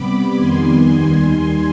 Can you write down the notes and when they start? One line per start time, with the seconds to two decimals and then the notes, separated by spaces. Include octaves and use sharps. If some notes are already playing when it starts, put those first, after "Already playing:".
Already playing: C3 G3 B3 B5 D6
0.34 F2 D#3 G3 B3 G#5 C6
0.90 D#2 D#3 G3